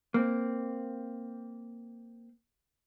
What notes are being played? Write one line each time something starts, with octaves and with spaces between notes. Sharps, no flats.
A#3 C4